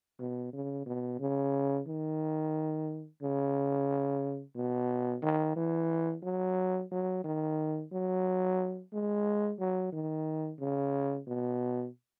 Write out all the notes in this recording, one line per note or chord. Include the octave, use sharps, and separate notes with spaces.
B2
C#3
B2
C#3
D#3
C#3
B2
D#3
E3
F#3
F#3
D#3
F#3
G#3
F#3
D#3
C#3
B2